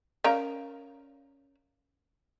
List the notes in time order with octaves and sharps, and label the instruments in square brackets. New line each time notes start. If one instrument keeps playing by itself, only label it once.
[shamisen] C#4 A#5 [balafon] A#4 D5 F5